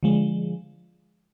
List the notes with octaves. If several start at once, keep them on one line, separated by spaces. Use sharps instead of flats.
D3 F3 G#3